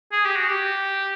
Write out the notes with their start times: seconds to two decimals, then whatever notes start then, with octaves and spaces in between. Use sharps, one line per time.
0.12 G#4
0.25 G4
0.36 F#4
0.49 G4